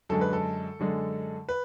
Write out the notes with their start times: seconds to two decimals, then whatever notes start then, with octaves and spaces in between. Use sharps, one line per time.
0.09 F#2 D3 G#3 A4
0.21 B4
0.33 A4
0.79 F#2 D3 G#3
1.49 B4